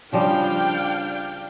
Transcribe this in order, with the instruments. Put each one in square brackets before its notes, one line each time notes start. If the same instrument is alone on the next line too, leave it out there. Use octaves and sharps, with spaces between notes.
[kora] C#3 F3 G3 [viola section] D4 F5 G5